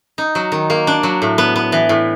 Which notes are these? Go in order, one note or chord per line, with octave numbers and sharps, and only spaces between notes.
D#4
F#3
D#3
A#3
D4
F#3
A2
B3
B3
E3
A2